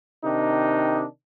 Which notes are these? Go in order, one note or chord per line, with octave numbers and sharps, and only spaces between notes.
C3 D#3 D4 D#4